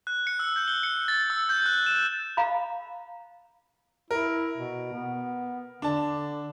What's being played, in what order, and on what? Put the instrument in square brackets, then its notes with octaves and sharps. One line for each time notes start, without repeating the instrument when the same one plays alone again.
[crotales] F#6
C#7
E6
G6
G7
C#7
A6
E6
G6
F#6
E7
[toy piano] F5 A#5 B5
[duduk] E4 [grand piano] A#4
[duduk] B2
B3
[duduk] D3 [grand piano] D4 A5